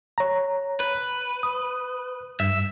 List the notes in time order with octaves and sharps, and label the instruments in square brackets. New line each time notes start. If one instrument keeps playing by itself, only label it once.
[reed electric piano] C#5 A#5
[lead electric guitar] B4
[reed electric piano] D#6
[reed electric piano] G2 [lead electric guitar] E5